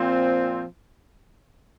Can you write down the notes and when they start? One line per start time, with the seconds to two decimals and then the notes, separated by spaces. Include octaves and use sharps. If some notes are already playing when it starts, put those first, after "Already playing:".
Already playing: A#2 F3 C4